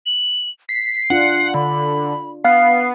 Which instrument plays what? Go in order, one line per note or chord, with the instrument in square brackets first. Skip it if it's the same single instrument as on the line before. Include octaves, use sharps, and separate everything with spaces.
[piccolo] F#7
[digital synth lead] B6 [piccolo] C7
[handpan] D4 F4 [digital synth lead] F#5
[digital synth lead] D3 [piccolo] B5
[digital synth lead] B3 [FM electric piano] F5 [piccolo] C7